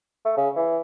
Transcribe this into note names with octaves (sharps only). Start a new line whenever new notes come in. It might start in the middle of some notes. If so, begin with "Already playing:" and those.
A3
C#3
E3